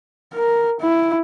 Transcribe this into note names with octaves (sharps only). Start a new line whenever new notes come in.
A#4
E4